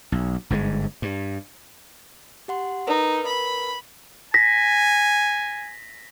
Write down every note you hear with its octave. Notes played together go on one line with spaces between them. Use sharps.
B1
G1 G#2 D3 G#3
G2
G4 F#5 C6
D#4 A#4 B4
B5
G#5 A#6 B6